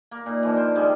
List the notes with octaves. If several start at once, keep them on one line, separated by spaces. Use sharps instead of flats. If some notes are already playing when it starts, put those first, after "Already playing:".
A#3
A#2 D#4
E3 F3 D4
F4 A#4 C5
D#3 G3 G#3 F4